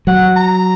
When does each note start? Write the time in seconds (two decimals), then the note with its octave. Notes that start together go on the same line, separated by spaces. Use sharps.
0.07 F#3 F#5
0.36 A#5